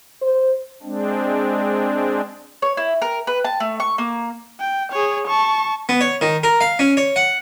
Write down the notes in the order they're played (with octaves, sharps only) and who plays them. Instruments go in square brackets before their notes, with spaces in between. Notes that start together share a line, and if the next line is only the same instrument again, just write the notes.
[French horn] C5
[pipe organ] G#3 C4 D4
[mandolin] C#5
E4
A#4
B4
A5
A3
C#6
A#3
[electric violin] G5
G#4 C#5
A5 C#6
[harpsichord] B3
C#5
D#3
A#4
F5
C#4
C#5
F#5